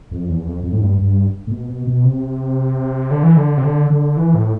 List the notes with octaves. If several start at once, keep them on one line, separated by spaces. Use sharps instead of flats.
F2
E2
F2
F2
A2
G2
G2
A2
B2
B2
B2
C3
D3
E3
D3
C3
D3
D3
E3
A2